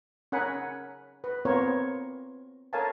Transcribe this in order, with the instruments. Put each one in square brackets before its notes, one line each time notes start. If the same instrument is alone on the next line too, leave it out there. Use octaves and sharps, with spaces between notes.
[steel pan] C#4 A#4 F#5 G#5 B5
B4
B3 C4 F4 A#4 C5 C#5
A4 A#4 C#5 F5 G#5 A5